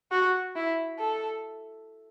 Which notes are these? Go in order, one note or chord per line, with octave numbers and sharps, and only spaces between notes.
F#4
E4
A4